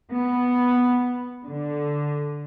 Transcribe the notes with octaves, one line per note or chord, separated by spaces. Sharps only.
B3
D3